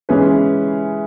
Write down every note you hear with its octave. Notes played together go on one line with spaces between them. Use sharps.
E3 G#3 C#4 G#4 B4